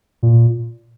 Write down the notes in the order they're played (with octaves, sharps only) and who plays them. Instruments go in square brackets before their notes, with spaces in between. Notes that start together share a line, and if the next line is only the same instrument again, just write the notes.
[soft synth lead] A#2